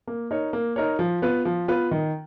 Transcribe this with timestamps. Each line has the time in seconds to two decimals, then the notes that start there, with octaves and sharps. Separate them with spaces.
0.07 A#3
0.31 D#4 A#4 C#5
0.53 A#3
0.76 D#4 A#4 C#5
0.99 F3
1.22 B3 F4 B4
1.45 F3
1.68 B3 F4 B4
1.91 D#3